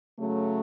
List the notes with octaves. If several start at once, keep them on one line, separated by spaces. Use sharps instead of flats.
C#3 F#3 A3